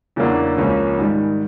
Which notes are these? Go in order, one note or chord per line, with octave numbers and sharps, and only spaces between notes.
E2 C#3 F#3 A#3 D4
C#2 C#3 F3 A#3 C#4
G#2 D#3 G3